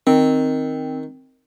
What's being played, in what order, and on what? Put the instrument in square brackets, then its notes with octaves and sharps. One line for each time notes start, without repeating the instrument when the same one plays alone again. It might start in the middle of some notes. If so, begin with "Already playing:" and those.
[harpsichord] D#3 [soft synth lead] C4